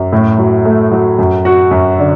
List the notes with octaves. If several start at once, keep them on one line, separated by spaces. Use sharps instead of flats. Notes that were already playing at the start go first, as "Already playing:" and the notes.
Already playing: F#2
A2
F#3
A3
F#3
F#2
F#4
F#2
D3